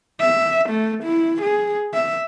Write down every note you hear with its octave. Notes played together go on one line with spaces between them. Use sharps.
E5
A3
E4
G#4
E5